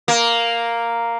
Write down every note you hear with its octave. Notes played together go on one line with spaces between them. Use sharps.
A#3